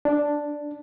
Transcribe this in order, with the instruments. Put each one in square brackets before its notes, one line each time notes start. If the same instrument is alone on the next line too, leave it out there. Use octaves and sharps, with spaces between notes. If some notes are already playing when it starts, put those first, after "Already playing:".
[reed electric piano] D4